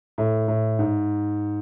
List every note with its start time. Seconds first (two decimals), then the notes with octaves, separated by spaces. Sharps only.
0.18 A2
0.48 A2
0.79 G#2